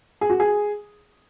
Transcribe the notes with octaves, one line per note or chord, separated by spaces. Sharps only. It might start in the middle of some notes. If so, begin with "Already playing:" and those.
G#4
F#4
G#4